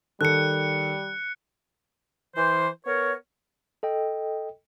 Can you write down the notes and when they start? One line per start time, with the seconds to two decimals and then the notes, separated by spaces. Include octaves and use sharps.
0.21 D#3 G3 A4 F#6 C#7
2.36 E3 C5
2.86 B3 A#4 C#5
3.83 A4 D#5 G5